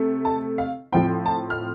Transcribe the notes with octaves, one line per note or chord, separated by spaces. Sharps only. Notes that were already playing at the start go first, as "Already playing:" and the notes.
Already playing: C3 A3
A5
F5
A2 F3 C4 G5
A5
F6